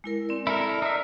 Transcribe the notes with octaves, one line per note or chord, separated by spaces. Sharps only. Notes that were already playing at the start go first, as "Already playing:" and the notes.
G#3 E4 A#4
C4 D5
E4 A4 A#4
D5
D#4 E5